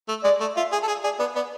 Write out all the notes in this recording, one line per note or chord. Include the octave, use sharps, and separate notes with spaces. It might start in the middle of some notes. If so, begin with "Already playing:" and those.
A3
G#3 D5
A3
F4 E5
G#4
A4
G#4
G#4 D5
B3 D5
B3 D5